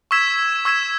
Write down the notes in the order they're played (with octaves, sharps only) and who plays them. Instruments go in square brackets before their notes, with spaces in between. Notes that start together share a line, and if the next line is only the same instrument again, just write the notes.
[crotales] C#6 E6 G#6 B6 E7
C#6 E6 G#6 B6 E7